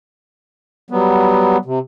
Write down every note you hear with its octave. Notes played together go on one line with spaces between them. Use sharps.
F#3 G3 B3
C3